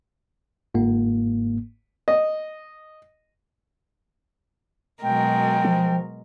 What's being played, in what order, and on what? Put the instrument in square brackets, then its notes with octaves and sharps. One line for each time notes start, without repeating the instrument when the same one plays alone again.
[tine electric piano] G1 G#2 A#3
[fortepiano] D#5
[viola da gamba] B2 G#3 [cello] F#3 A#4 [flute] G5
[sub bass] F3